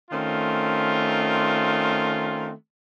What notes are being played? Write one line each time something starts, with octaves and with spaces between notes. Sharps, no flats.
D#3 A3 C4 C#4 F4